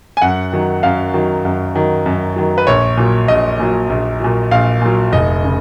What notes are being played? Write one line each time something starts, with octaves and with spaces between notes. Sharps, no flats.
G#5
F#2 F#5
D#3 F#3
F#2 F5
D#3 F#3
F#2
D#3 F#3
F#2
D#3 F#3
B4
A#1 C#5
A#2 F#3
A#1 D#5
A#2 F#3
A#1
A#2 F#3
A#1 F5
A#2 F#3
F1 D#5
C#3